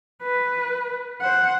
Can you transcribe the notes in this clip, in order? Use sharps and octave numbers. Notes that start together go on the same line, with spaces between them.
B4
C5 F#5